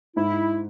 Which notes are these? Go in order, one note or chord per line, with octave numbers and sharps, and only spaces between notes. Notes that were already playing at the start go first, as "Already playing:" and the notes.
G#2 E4